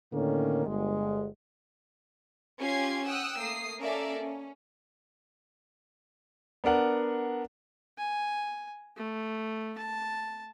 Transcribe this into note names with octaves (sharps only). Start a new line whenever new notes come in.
A2 D3 D#3 A#3 C#4
G1 G#3
C#4 F4 G4 C6 G#6 C7
F#5 G5 D#6 E6 F#6
A3 A#3 D#6 C7
A#3 C#4 A4 A#4 D5 E5
C#4
B3 D4 A#4 F#5
G#5
A3
A5